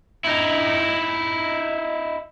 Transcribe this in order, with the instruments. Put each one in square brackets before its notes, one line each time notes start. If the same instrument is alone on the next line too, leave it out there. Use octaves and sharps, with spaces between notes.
[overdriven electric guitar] D#4 E4